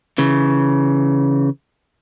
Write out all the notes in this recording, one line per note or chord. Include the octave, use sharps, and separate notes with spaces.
C#3 E3